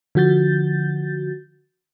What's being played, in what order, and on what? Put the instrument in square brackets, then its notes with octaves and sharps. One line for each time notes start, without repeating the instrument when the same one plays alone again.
[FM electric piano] D3 F3 F#4 G6 A6